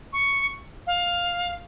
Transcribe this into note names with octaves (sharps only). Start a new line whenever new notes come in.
C#6
F5